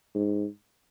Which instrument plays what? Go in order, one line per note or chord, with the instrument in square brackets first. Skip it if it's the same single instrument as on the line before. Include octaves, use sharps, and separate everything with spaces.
[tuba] G#2